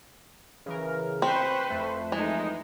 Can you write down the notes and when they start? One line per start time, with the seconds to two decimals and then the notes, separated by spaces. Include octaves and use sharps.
0.66 C#3 E3 A#4
1.22 C4 B4 C5 B5 C#6
1.70 F2 A3
2.12 E3 G#3 D#4